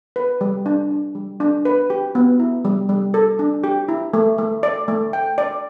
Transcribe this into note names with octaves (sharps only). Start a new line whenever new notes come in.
B4
G3
D4
D4
G3
D4
B4
G4
B3
E4
G3
G3
A4
D4
G4
E4
A3
A3
D5
A3
G5
D5